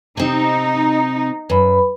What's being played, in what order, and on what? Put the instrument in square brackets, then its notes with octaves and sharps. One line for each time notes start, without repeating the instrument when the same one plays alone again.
[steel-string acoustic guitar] C3 C4 [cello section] D#4
[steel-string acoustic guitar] F#2 [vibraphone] B4 B5